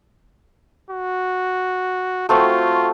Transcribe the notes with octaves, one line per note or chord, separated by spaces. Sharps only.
F#4
A3 C4 F4 F#4